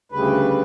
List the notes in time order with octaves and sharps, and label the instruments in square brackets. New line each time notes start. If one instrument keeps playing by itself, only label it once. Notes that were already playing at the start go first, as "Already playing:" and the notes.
[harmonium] D2 C#3 G3 B4